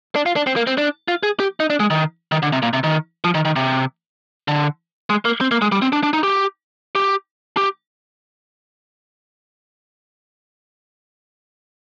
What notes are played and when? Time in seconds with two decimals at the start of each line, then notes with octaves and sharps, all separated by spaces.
0.16 D4
0.26 F4
0.36 D4
0.47 C4
0.56 A#3
0.67 C4
0.78 D4
1.08 F4
1.23 G#4
1.40 G4
1.60 D#4
1.70 D4
1.80 G#3
1.90 D#3
2.32 D#3
2.43 D3
2.52 C3
2.63 A#2
2.73 C3
2.84 D#3
3.24 F3
3.35 D#3
3.45 D#3
3.56 C3
4.48 D3
5.10 G#3
5.25 A#3
5.41 C4
5.51 A#3
5.62 G#3
5.72 G3
5.82 C4
5.93 D4
6.03 D4
6.13 D#4
6.23 G4
6.95 G4
7.57 G4